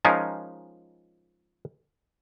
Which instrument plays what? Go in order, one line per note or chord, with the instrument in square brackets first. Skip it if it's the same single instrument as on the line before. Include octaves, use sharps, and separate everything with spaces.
[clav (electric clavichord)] F3 G#3 C#4 D#4 F4 A#4